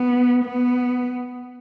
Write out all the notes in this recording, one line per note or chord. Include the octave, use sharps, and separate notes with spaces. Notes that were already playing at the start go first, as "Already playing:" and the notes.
Already playing: B3
B3